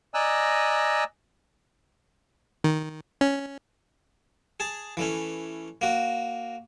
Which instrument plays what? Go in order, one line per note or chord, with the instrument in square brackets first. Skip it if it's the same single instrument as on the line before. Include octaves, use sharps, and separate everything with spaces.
[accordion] D5 D#5 G#5 A#5 E6 F#6
[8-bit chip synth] D#3
C#4
[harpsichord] G#4 A5
E3 A3 C#4
A#3 F#4